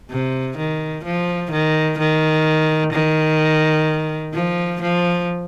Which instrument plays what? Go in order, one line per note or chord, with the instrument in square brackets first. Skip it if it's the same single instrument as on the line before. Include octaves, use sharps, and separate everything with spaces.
[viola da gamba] C3
D#3
F3
D#3
D#3
D#3
F3
F3